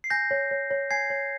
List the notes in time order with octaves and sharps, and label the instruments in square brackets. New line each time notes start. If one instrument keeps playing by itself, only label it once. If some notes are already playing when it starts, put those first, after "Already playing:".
[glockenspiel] C7
[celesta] G#5 [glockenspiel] G6 A#6
[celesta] C#5
C#5
C#5
[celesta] G#5 [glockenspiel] G#6 C7
[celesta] C#5